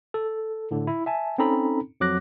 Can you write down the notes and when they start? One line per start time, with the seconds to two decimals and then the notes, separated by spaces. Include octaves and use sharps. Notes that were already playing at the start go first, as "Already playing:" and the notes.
0.14 A4
0.71 A2 D3
0.87 E4
1.06 E5 G#5 A5
1.38 C4 C#4 D#4 A4 A#5 B5
2.00 F2 F#3 D6 F#6 A#6